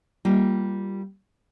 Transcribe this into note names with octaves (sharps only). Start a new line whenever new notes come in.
G3 A#3 F4